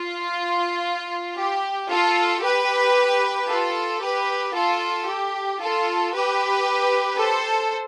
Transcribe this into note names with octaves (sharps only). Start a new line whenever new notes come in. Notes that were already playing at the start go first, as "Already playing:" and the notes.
Already playing: F4
G4
F4 A4
G4 B4
F4 A4
G4 B4
F4 A4
G4
F4 A4
G4 B4
A4 C5